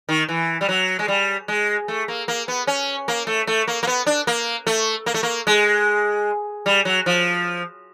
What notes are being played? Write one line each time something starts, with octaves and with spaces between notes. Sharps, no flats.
D#3
E3
G3
F#3
G#3
G3
G#3
A3
A#3
A#3
B3
C#4
A#3
A3
A3
A#3
A#3
B3
D4
A#3
A3
A#3
A3
A#3
G#3
G3
F#3
F3